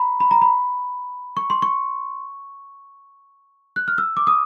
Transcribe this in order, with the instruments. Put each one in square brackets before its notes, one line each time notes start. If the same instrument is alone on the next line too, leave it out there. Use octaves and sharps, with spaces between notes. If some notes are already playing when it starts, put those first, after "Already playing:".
Already playing: [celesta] A#5 B5
B5
A#5
B5
C#6
C6
C#6
F#6
F6
E6
D6
D#6